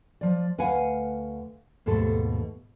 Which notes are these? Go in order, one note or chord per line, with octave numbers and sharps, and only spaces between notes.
F3 D5
D2 B4 F5 F#5 G#5
D#2 G#2 B2 A3 A4